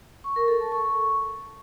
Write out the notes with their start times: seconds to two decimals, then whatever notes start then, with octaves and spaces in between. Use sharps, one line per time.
0.24 C#6
0.36 A#4
0.48 A4
0.60 A5
0.72 C#6